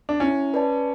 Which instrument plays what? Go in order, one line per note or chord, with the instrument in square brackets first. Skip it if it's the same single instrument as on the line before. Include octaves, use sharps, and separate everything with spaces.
[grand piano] D4
[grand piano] C#4 [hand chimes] E4
[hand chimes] B4 D5 A5